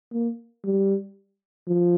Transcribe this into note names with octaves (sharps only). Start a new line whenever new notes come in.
A#3
G3
F3